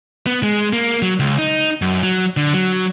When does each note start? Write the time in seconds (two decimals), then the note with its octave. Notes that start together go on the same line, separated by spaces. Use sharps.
0.26 B3
0.43 G#3
0.73 A#3
1.02 F#3
1.19 C#2
1.38 D#4
1.82 F#2
2.03 F#3
2.37 D3
2.53 F#3